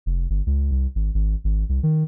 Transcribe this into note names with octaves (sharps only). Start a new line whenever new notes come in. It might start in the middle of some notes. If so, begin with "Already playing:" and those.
F1
G1
C#2
C2
G#1
G#1
G#1
C2
D#3